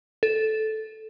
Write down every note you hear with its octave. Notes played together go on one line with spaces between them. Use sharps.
A4